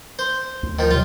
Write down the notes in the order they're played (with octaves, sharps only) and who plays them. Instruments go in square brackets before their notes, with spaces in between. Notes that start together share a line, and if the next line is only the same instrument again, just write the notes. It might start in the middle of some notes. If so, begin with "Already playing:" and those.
[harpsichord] C5
[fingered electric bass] D2
[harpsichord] D#3 F3
[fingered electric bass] C3 F#3 [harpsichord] F4